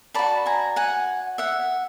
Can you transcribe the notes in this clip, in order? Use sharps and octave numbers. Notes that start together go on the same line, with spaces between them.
F#4 A4 D5 A5 B5
G#5 A#5
F#5 G#5
E5 F#5